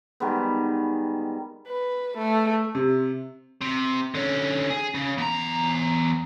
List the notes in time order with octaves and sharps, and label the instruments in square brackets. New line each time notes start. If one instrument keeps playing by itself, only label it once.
[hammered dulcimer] D#3 G3 G#3 B3
[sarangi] B4
A3
[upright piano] C3
[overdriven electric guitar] C3
D3 C#4
G#4
C#3
E2 A#5